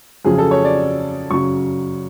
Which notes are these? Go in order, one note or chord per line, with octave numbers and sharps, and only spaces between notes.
F2 C#3 F#3 G#4
A4
C#5
D5
F#2 C#3 F#3 C#6